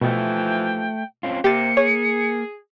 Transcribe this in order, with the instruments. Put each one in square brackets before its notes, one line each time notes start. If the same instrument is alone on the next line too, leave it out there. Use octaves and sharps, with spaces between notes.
[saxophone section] D#2 E3 F3 [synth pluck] B2 [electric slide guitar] A3 [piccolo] G5
[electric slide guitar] C4 C#4 F4
[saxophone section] C3 C4 [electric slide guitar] A#3 [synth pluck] G4 A6 [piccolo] C#7
[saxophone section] G#4 [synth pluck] C#5